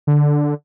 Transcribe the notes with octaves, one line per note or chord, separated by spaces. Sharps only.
D3